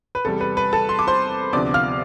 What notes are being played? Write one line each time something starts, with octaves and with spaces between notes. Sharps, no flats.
B4
E2 C3 G3 A4
B4
B4
A4 A5
C6
D6
C5 C6
D2 C3 F3 B3 D5 D6
F5 F6